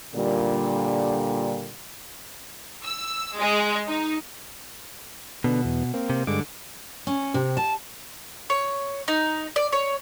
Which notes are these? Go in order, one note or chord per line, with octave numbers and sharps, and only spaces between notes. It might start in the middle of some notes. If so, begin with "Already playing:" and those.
A#2 D3 G3
E6
G#3
D#4
B2 D3 B3
E2
A#3 C4
C3
G2 D3 G#3 D6
C#4
C3
A5
C#5
D#4
D5
C#5